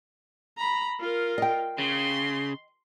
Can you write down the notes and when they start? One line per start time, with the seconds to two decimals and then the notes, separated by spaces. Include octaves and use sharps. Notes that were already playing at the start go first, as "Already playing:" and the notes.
0.58 A#5 B5
1.00 F4 A#4
1.38 D#5 G5
1.78 C#3 C6